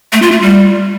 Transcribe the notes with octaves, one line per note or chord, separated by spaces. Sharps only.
A3
F4
A3
G3